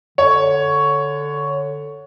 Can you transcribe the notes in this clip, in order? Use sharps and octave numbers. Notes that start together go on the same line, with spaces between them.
D3 C#5